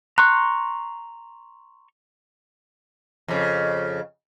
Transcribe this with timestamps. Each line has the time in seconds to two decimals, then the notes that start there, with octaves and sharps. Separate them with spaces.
0.18 A#5 C6 C#6 F#6
3.28 F2 C#3